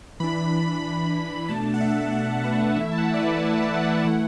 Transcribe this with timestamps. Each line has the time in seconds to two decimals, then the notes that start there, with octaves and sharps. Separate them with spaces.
0.20 E3 D4 B5
1.48 B2 A3 D4 A5
1.74 F#5
1.80 E5
2.13 E5
2.44 B4
2.76 E3 A3 E4 E5
2.91 A5
2.98 F#5
3.14 D5
3.19 B4
3.40 D5
3.62 E5
3.74 F#5
3.83 A5
3.97 A5
4.05 E3 A3 E4 F#5